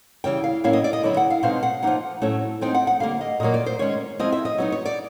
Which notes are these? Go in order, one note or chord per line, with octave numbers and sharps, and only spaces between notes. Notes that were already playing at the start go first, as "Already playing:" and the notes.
C#3 E3 G3 G5
F5
A2 F#3 A#3 C#4 E4 F5
D#5
D5
D#5
D3 F#3 B3 E4
F#5
F5
B2 G#3 C4 D#4 F5
F#5
F3 A#3 D#4 F#5
A2 F#3 A3 C#4 E4
F3 G#3 C4 D#4 G5
F#5
F#5
D3 G3 A#3 F5
D#5
A#2 F#3 A#3 D#5
D5
C5
D#3 G#3 C#4 C#5
F3 G#3 C4 E4 D#5
E5
D#5
F#3 B3 D#4
C#5
D5